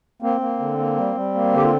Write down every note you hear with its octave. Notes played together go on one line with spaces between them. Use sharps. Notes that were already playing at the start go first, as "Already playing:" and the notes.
A#3 C4
A#3
D3
A#3
G3
G3
A#3
D3 G4
F4